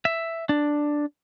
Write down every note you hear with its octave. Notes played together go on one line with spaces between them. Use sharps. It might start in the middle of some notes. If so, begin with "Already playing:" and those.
E5
D4